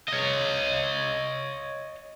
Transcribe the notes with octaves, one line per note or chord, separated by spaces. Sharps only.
C#5 D#5